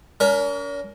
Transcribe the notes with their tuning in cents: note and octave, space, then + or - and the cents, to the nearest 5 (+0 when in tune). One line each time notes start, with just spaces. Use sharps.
C#4 +45 A#4 +5